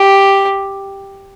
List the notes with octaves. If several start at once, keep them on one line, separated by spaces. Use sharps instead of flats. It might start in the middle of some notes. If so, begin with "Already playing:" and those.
Already playing: G4